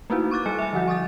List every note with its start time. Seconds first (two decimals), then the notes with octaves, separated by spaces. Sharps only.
0.10 A3 A#3 D#4 E4 F#4
0.31 C#6 D6 F#6 A6
0.46 G3 D#5 A5 C#7
0.59 E5 G#5
0.73 D3 F3 F#4
0.88 C#6 D#6 A6